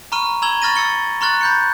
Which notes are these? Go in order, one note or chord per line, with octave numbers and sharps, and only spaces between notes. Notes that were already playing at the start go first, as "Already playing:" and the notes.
A#5 B5 C#6 F6 D#7
A#5 B5 E6 G#6 F#7 G7
B5 C#6 F6 A6 A#6 D#7
E6 A6 C#7 G7
A#5 C6 C#6 F6 F#6 A6
B5 G6 C#7